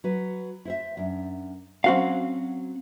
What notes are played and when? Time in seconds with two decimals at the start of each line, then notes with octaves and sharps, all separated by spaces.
0.04 F#3 F#4 B4
0.65 E4 C5 E5
0.97 F#2 D4
1.84 F#3 C4 C#4 F#4 F5